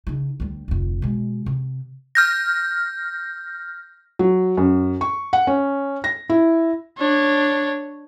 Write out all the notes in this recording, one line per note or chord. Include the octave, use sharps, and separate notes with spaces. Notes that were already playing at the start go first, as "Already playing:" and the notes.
C#3 D#4
D2 G3
F1 D2
B2 G#3
C3
F6 G6 A#6
F#3
F#2
C#6
F#5
C#4
A#6
E4
D4 C#5